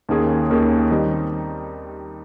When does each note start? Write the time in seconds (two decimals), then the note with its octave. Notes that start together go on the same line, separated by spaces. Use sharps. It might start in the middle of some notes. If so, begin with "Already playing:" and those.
0.09 D#2 D#3 A#3 C#4 G#4
0.50 D#2 D#3 A#3 C#4 G#4
0.91 D#3 G3 C4 D#4